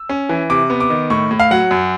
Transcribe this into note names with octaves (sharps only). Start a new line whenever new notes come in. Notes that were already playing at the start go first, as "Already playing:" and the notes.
Already playing: E6
C#4
E3
C3 D6
B3
D6
D#3
A2 C#6
A2
F5
F#3 F#5
F#2